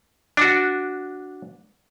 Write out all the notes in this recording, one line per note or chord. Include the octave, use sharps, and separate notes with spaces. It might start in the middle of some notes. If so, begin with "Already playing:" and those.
D4 F#4